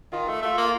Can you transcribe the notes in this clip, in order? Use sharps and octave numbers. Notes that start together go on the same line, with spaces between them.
D#3 F4
A3
A3 F4
A#3